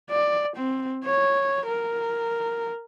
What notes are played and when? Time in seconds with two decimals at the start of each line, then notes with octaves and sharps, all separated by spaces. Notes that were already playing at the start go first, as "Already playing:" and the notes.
0.10 D5
0.56 C4
1.05 C#5
1.66 A#4